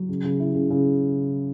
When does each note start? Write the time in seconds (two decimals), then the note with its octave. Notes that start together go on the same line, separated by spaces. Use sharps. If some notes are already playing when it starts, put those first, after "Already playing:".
Already playing: F#3
0.09 C#3
0.24 C#3
0.40 E4
0.55 C#3
0.70 C#3